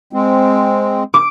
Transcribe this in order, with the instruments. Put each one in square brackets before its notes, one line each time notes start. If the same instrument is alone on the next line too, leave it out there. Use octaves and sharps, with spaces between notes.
[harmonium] G#3 C4
[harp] D6